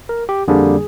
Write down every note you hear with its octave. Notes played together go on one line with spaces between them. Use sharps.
A#4
G4
F2 D3 G3 A#3 D4 G#4